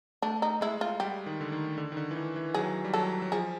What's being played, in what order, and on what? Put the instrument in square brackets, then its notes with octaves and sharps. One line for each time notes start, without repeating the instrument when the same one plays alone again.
[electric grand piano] A3 [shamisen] D4
[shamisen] D#4
[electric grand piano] G#3 [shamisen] E4
[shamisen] F4
[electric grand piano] G3 [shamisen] G4
[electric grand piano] D#3
D3
D#3
D3
D#3
D3
E3
D#3
E3
[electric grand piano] F#3 [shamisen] G#4
[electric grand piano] G3
[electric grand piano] F#3 [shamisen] A4
[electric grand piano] F#3
[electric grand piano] F3 [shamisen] G#4